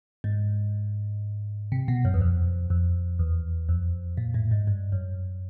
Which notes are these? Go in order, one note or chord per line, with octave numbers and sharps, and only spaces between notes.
G#2
C3
B2
F#2
E2
F2
F2
E2
F2
A#2
A2
G#2
G2
F#2